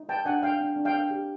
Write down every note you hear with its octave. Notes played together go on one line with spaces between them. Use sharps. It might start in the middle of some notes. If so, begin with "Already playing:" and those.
Already playing: D#4
B4 G5 A5
D4 F#5 G#5
D4 F5 G5
D4
D4
F5 G5
D4
G4